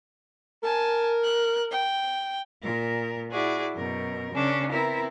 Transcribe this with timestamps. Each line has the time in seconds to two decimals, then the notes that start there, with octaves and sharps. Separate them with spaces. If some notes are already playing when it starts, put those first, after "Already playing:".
0.63 A#4 G#5 A5
1.24 F#6
1.71 G5
2.63 A#2 A#4
3.32 E4 F#4 G#4 D5
3.75 F#2 B2 A#4
4.33 C#3 C#4 D4
4.70 B3 C4 E4 A#4